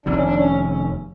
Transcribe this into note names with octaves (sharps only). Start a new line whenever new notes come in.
F1 F2 C3 D#3 D4
C#4
D4
C#4
C#4